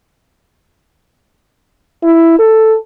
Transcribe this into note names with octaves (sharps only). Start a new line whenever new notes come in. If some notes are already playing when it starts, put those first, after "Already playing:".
E4
A4